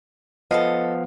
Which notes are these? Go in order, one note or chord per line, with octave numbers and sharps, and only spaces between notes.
F3 B3 A4 B4 D#5 F5